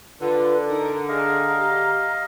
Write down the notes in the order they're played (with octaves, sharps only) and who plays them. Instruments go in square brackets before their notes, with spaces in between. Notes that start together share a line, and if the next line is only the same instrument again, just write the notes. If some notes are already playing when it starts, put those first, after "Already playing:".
[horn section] D3 [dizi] F4 [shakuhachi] B4
[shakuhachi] D#4 [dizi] A#4
[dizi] G#4 [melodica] D#5 F5 [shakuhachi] A#5
[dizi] G4